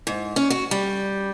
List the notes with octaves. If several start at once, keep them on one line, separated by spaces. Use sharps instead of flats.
G#2
C#4
F#4
G3